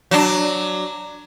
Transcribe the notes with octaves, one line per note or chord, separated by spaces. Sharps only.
F#3 D4